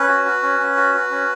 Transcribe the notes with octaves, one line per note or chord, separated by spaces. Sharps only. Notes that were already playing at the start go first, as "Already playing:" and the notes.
Already playing: C#4 B4
F#4
F#4
C#4
C#4
F#4
F#4
C#4